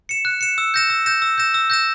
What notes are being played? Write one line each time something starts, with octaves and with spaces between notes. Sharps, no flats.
C#7 E7
F#6
C#7 E7
E6
G6 A#6 E7
E6
G6 A#6 E7
E6
G6 A#6 E7
E6
G6 A#6 E7